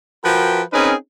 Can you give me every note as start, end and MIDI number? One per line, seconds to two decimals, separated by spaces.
0.24 0.62 53
0.24 0.62 66
0.24 0.62 70
0.24 0.62 71
0.24 0.62 79
0.24 0.62 83
0.73 0.94 60
0.73 0.94 61
0.73 0.94 63
0.73 0.94 68
0.73 0.94 70
0.73 0.94 71